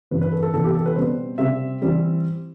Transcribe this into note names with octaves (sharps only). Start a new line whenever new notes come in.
G2 E3 G3 C4 B4
B4
A4
A4
C3 E3 B3 A4
G4
A4
B4
B2 G3 C4 C5
C3 G3 C4 E5
E3 G3 C4